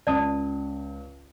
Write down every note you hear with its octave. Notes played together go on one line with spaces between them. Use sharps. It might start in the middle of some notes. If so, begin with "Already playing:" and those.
C#2 D5 A5 D#6